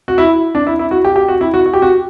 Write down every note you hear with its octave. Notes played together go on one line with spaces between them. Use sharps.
F#4
E4
D4
E4
E4
F#4
G4
G4
F#4
E4
F#4
F#4
G4
F#4